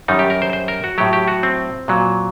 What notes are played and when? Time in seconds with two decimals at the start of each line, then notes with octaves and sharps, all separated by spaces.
0.08 F#2 D#3 G3 D#4
0.19 G4
0.30 A#4
0.42 C5
0.53 C5
0.68 A#4
0.84 F#4
0.98 A2 F#3 G4
1.13 G4
1.28 F#4
1.43 C4
1.88 A#2 F#3